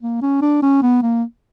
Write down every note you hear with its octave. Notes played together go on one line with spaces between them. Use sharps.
A#3
C#4
D4
C#4
B3
A#3